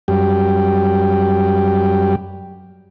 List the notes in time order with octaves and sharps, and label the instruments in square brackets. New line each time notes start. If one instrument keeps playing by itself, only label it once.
[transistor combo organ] F#2 G3 G4